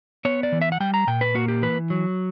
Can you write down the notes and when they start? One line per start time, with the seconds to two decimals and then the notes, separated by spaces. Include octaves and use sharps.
0.25 B3 C#5
0.43 D5
0.52 E3
0.61 E5
0.72 F#5
0.80 G3 G5
0.94 A#5
1.07 A#2 G5
1.21 B4
1.35 A#3 F#4
1.48 G4
1.62 E3 B4
1.90 F#3